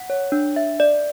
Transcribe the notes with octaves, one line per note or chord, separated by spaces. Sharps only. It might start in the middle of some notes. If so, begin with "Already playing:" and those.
Already playing: F#5
C#5
D4
E5
D5